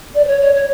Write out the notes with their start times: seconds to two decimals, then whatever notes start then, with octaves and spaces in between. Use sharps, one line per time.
0.14 D5
0.24 C5
0.27 C#5
0.41 C#5
0.54 C#5